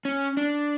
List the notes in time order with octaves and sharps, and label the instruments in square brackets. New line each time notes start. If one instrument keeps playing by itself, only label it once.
[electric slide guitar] C#4
D4